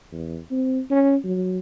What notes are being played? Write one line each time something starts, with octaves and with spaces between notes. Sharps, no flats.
E2
C4
C#4
F#3